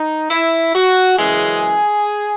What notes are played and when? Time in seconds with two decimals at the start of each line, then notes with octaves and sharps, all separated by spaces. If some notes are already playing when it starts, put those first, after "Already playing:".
Already playing: D#4
0.30 E4
0.74 F#4
1.18 F#2 C#3 E3 G#3 G#4